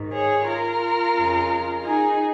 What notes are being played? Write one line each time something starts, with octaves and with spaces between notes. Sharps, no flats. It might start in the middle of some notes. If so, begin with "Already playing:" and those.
Already playing: G#2 D#3
G#4 C#5
F4 A#4
F2 C#3
D#4 G#4